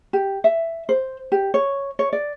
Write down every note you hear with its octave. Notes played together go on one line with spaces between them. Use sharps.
G4
E5
C5
G4
C#5
C#5
D5